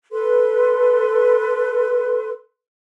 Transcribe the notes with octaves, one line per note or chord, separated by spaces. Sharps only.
A4 B4 C6